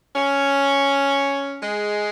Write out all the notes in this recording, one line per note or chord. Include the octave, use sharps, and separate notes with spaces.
C#4
G#3